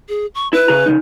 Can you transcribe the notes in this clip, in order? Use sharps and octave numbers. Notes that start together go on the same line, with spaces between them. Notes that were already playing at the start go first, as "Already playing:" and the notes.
G#4
C#6
E4 B4
C#3 G#4 A#5
C#3 F3 D#4